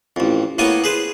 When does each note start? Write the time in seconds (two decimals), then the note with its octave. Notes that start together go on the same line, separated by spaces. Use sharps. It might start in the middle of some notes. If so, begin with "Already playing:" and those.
0.16 A1 F2
0.58 A2 A#3 B3 C#5 G#5
0.84 G#4 B4 C5